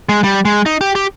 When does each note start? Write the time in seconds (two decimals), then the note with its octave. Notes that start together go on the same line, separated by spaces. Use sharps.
0.09 G#3
0.24 G3
0.45 G#3
0.66 D#4
0.81 G4
0.95 G4